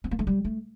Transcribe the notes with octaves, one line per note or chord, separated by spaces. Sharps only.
C4
A#3
A3
G3
A3